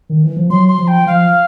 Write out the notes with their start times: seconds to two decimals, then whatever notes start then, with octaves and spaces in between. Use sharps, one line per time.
0.10 D#3
0.24 E3
0.37 F3
0.50 F#3 C6
0.68 C6
0.78 F3
0.88 G5
1.06 F3 F5